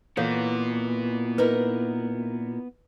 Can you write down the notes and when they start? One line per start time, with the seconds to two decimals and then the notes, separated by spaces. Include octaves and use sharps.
0.17 A#2 E3 B3 F#4 A4 C#5 F5
1.38 D#4 E4 A#4 B4